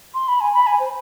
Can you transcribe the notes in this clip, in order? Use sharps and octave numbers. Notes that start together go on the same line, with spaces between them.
C6
B5
G#5
B5
G#5
C5